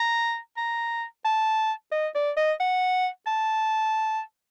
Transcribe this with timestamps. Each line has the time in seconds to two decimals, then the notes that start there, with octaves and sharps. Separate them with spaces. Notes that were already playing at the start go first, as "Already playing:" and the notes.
Already playing: A#5
0.57 A#5
1.25 A5
1.92 D#5
2.15 D5
2.37 D#5
2.60 F#5
3.27 A5